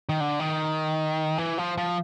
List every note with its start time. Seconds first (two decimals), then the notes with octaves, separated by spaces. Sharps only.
0.09 D#3
0.20 D3
0.40 D#3
1.38 E3
1.58 F3
1.77 F3